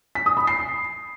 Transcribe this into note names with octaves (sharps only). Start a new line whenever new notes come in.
B6
D#6
B5
C7